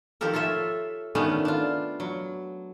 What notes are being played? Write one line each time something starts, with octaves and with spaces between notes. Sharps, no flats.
D#3 F3 G4 A4 A#4
F4 A4 C#5 E5
D#3 A3 B3 C#4 D4
D4 F4
F#3